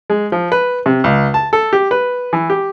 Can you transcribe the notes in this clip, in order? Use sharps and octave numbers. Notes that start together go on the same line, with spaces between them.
G#3
F3
B4
C3
C#2
A5
A4
G4
B4
E3
G4